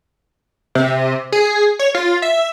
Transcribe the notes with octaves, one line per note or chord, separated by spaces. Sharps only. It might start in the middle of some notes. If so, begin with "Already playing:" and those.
C3
G#4
C#5
F4
E5